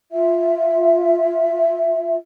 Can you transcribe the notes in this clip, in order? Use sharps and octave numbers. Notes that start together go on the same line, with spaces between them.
F4 E5